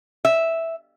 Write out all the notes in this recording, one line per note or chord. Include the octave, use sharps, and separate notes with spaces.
E5